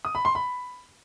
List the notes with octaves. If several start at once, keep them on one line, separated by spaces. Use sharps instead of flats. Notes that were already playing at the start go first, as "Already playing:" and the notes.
D#6
B5
C6
B5